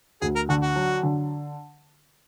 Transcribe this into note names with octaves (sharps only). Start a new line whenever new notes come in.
D2 G#4
A#4
D3 F#4
F#4
F#3
D3